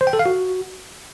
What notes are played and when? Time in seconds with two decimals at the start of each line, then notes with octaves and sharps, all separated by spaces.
0.01 C5
0.07 G5
0.13 A4
0.19 F5
0.26 F#4